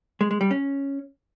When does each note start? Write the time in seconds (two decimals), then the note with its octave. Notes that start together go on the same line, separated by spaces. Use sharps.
0.21 G#3
0.31 G#3
0.41 G3
0.51 C#4